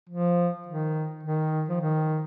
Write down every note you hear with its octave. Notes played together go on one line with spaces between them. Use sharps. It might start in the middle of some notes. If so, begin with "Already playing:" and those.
F3
D#3
D#3
F3
D#3